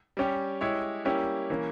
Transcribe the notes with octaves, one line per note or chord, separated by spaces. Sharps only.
G3 C#4 G4
G#3 E4 G4 C#5
G3 A#3 C#4 E4 G4
E3 A#3 C#4